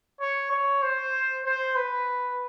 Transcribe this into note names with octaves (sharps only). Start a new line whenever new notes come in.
C#5
C#5
C5
C5
B4